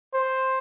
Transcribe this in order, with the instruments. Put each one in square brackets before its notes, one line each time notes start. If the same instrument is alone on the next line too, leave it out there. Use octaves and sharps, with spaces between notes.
[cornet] C5